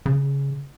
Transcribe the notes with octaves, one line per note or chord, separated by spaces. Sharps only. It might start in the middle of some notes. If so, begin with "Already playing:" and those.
C#3